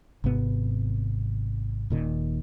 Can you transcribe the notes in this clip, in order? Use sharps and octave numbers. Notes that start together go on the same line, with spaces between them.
G#1 G#2 C3 B3
D#1 A#2 D#3